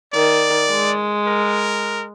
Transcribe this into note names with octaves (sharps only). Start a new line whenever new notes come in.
D#3 D5
G#3
A#4